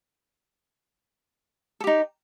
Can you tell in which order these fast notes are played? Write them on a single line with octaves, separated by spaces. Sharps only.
A4 G4 D#4